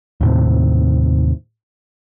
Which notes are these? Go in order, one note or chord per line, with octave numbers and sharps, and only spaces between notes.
D#2 A2 C3